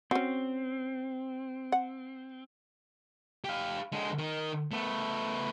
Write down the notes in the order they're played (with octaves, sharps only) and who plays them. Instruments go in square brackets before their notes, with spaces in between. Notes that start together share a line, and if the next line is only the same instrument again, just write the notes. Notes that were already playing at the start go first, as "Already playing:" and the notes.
[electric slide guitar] C4 [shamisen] C#4 F#4
[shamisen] F#5
[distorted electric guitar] G4 F5
D3 G#3
D#3
A3 B3